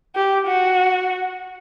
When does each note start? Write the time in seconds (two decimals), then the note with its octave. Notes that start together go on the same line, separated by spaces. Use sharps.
0.15 G4
0.47 F#4